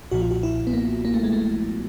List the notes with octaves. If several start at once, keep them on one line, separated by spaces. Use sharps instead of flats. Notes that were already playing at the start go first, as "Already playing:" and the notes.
B1 A#2 F3 F#4
F4
F#4
E4
B3
A#3
A#3
A3
G#3
A3